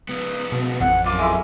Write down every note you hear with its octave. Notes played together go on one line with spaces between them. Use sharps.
C#2 B3
B2
A1 F2 F#5
F#2 F4 D6
G#3 A3 E4